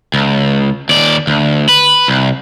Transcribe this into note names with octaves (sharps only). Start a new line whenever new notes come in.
C#2
D#2 D5
D2
B4
C2